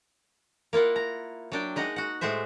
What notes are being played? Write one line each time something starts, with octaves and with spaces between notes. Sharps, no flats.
A#3 E4 F4 F#5
A#5
F#3 D4 G5
G#3 D#4 D#5 F#5
F#4 F#5
A2 G#3 F#4 C5 E5